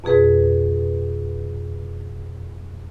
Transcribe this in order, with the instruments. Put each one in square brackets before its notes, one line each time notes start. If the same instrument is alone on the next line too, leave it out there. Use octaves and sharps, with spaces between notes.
[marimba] F2 B2 G#4 B4